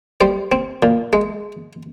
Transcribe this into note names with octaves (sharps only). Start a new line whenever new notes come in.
G3 C5
C4
A#2
G#3